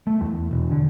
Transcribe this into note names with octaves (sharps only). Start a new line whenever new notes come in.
A3
E2
E1
D3